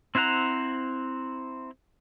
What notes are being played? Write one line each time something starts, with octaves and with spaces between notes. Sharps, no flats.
C4 E4 C5 F#5 A#5